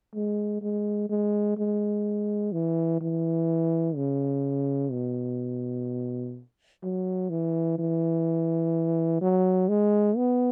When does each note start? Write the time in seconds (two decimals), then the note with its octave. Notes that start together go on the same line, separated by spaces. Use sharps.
0.15 G#3
0.62 G#3
1.09 G#3
1.57 G#3
2.52 E3
3.00 E3
3.96 C#3
4.91 B2
6.83 F#3
7.30 E3
7.78 E3
9.21 F#3
9.69 G#3
10.16 B3